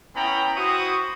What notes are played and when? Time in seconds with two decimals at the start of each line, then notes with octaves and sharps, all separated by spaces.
0.16 B3 C#4 E4 G5 A#5 B5
0.56 E4 F#4 C5 C#6 D#6